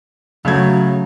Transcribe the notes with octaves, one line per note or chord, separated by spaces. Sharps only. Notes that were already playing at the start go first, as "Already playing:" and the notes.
C#3 F#3 A3 G#6